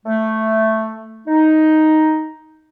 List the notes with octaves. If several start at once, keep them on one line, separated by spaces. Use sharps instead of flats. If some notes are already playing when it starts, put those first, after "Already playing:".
A3
D#4